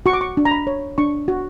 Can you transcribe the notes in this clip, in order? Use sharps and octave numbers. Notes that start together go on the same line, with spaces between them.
F#4 C#6
D6
C#6
D4
A#5
B5
C#5
D4 C#6
F#4